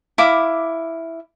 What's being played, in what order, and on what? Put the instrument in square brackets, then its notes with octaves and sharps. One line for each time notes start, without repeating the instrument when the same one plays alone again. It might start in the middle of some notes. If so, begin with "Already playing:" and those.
[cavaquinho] E4 F5 D6